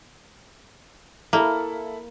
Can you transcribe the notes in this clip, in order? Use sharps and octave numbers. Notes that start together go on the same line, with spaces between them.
A#3 E4 A4 B5